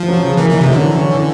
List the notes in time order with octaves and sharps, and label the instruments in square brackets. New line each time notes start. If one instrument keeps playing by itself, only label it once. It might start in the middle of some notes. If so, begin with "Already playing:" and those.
Already playing: [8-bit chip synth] F3
[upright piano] F#3
C#3
[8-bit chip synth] E3 [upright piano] A#3
[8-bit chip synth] E3 [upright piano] D#4
[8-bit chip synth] C3
[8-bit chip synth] D3 [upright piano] F#3
[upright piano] E3
C#4
E3